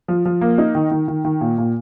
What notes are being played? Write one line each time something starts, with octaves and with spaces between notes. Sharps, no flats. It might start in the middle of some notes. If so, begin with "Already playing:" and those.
F3
F3
A#3
D#4
D#3
D#3
D#3
D#3
A#2
A#2